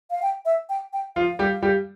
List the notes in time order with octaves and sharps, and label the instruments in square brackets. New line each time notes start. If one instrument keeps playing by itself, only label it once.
[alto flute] F5
G5
E5
G5
G5
[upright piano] F3 F4 [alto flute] F5
[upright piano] G3 G4
G3 G4